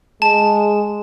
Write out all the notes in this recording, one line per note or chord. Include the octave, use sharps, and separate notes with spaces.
G#3 A5